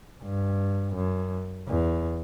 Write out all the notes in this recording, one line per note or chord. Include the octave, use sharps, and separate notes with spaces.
G2
F#2
E2